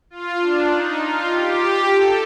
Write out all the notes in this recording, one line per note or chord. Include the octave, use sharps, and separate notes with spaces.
F4
D4
D#4
F4
G4
A4